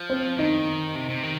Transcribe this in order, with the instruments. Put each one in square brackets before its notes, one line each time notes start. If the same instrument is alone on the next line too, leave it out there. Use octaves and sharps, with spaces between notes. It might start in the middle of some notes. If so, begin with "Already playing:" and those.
Already playing: [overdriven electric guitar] F3
[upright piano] C4
[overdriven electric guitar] D#3 [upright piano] D#4
[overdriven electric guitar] C3
C3
D#3